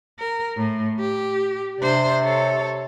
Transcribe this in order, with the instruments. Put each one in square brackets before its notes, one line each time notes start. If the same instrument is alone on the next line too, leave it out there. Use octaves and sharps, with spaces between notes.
[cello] A#4
A2
G4
[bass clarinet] C3 [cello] D4 C5
[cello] A4 C#5